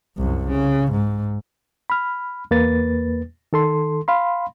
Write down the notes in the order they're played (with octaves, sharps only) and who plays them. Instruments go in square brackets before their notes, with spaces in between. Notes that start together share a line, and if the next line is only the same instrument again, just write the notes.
[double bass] C2 F#2
C#3
G#2
[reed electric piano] B5 F6
E2 A#3 B4 A6
D#3 A4 C6
F5 B5 C6